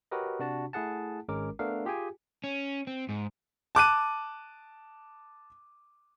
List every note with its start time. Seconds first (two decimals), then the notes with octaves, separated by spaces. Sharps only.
0.11 F#4 G4 A#4 B4 C#5 D#5
0.39 C3 D4 F#4 A5
0.73 A3 E4 G#4 F#5 A5
1.28 G#1 G#3 C#4 A#4 D6
1.59 A3 B3 D4 A4 A#4 F5
1.85 F4 G4 G#4 G5 G#5
2.44 C#4
2.87 C4
3.09 G#2
3.75 A5 D6 F#6 D#7